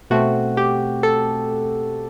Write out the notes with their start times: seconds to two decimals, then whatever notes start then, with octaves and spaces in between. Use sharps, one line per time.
0.10 B2 A3 C4 F#4
0.57 G4
1.03 A4